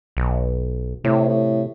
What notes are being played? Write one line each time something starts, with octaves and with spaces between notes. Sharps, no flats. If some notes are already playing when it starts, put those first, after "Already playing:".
B1
A2 C3
A2